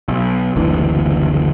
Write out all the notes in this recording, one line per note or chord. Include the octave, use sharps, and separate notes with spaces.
B1
F#1 D2 D3 E3